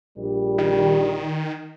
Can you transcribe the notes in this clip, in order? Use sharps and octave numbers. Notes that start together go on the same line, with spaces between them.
A#1 G3
D#3